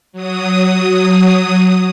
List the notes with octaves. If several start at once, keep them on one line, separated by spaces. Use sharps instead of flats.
F#3 D#6